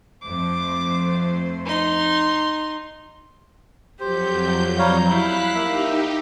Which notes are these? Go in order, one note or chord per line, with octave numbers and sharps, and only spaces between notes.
F2 A3 C5 D6
D#4 C6
F2 F#3 G4 C5 G6
G3 C#5 F5 A#5
G3 E4 F5 F#6 B6
A#3 D#4 G4 E5